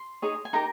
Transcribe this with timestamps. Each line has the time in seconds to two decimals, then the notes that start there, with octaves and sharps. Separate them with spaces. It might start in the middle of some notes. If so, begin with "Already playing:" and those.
Already playing: C6
0.22 D#4 G#4 C#5
0.45 G#5
0.53 D#4 G4 A#4 A#5